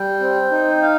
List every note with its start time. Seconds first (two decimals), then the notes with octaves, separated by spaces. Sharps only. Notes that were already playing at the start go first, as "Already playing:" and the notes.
Already playing: G3 G5
0.20 C4
0.51 D#4
0.82 F5